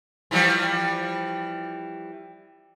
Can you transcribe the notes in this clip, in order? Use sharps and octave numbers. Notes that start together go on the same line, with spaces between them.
E3 F3 G3